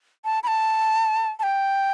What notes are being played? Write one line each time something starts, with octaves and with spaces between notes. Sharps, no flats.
A5
B5
A5
A5
G5